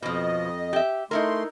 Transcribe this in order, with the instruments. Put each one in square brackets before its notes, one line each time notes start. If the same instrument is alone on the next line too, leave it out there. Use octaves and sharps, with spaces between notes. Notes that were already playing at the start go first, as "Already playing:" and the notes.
[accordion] F2 D#5 [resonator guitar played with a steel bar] B2 F3
[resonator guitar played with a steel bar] G4 E5
[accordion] A3 C6 [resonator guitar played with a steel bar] D#4 E4 A#4